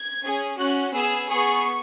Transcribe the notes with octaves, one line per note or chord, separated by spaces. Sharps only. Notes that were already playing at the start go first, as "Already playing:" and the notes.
Already playing: G#6
C#4 G#4
C#4 F#4 F#6
B3 G#4 E6
B3 G#4 C#6